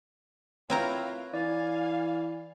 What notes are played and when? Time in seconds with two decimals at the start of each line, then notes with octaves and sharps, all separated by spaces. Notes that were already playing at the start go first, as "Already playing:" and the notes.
0.70 C4 E4 F4 A#4 B4 C#5 A#5
1.34 E3 D5 F5 G#5